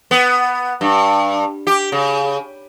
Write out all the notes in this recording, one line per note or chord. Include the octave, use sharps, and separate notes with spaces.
B3
G2
G4
C#3